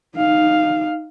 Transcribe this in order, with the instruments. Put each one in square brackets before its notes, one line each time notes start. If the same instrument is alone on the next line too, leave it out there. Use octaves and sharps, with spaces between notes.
[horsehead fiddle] D#4 F5